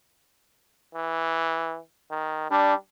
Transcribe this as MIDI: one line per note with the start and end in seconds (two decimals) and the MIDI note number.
0.94 1.78 52
2.11 2.51 51
2.51 2.74 55
2.51 2.74 62